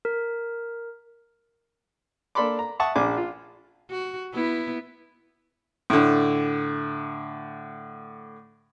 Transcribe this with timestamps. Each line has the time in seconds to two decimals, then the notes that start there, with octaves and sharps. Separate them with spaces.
0.05 A#4
2.35 A#3 D4 A4 B5 C6 D6
2.59 A#5
2.80 E5 F#5 A5 C#6 D#6
2.96 A#1 D4 G#5 D6
3.17 F4
3.91 F#4
4.34 B3 E4
5.90 A2 D3